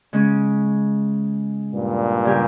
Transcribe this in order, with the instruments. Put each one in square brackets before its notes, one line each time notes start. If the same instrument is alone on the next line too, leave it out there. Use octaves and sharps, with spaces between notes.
[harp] C#3 G#3 C#4
[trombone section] G2 A#2
[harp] C#3 G3 C#4 G4 A#4